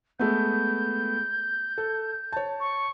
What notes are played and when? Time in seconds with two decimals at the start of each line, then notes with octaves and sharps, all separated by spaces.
0.19 G#3 A3 B3 G6
1.78 A4
2.32 C#5 A5
2.60 C#6